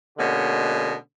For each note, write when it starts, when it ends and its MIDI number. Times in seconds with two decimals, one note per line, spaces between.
0.18 0.94 47
0.18 0.94 50
0.18 0.94 56
0.18 0.94 58
0.18 0.94 61
0.18 0.94 66